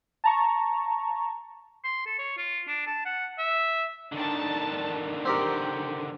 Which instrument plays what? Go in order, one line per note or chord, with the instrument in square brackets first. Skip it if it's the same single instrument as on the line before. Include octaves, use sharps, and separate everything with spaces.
[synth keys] A5 A#5 C#6
[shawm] C6
A4
C#5
F4
D4
A5
F#5
E5
[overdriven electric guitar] D3 D#3 [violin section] D4 A5
[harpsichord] C4 G4 A#4 [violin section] F#5 G5